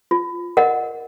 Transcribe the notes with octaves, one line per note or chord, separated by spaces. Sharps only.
F4
A#4 D#5 F#5